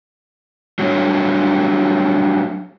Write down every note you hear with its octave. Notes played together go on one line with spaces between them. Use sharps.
F#3 G3 A3 A#3 D4 C#5